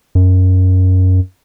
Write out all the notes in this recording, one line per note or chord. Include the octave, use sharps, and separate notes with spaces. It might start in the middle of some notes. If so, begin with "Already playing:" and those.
F#2